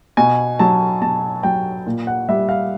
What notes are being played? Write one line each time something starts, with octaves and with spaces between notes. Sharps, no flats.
B2 G#5
F#3 A5
B2 A5
F#3 G5
A#2
F#5
G3 E5
F5